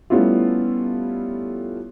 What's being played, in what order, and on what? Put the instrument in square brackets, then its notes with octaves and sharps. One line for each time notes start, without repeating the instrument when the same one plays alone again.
[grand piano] G3 A3 B3 C#4 E4 F4